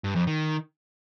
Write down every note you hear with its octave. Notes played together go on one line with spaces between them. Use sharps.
G2
F2
D#3